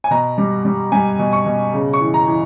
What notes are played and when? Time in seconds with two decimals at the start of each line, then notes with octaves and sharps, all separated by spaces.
0.04 G#5
0.11 B2 A#5
0.38 G3
0.65 G3
0.92 G3 G#5
1.19 B2
1.33 C#6
1.46 B2
1.73 C#3
1.93 C#6
2.00 E3
2.14 A#5
2.28 E3